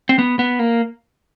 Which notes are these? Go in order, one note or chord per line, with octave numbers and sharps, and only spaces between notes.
C4
B3
B3
A#3